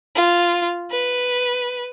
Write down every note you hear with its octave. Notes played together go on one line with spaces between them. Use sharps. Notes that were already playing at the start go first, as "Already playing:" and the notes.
F4
B4